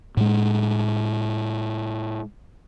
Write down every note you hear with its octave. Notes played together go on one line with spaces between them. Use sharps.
A2 G#3